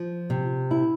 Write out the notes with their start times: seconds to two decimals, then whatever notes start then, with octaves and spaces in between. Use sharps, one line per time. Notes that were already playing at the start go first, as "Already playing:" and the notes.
Already playing: F3
0.30 C3
0.71 E4